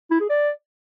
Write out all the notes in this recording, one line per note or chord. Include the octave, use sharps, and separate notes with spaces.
E4
G#4
D5